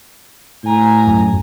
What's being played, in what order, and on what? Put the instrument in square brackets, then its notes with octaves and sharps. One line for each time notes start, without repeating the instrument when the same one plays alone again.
[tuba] A2 [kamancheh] G#5 A#5
[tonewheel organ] F#2